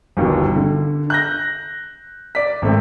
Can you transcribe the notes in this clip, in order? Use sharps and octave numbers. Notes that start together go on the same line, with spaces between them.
G1 D#2 B2
D3
F#6 G6 A#6
D5 B6
G#1 A3 C4